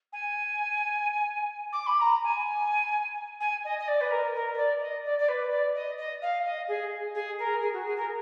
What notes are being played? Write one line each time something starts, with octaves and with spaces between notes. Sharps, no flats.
G#5
D6
B5
A#5
G#5
G#5
D#5
D#5
D5
B4
A#4
A#4
B4
D5
D#5
D5
D5
B4
D5
D#5
D#5
F5
D#5
G#4
G#4
A#4
G#4
F#4
G#4
A#4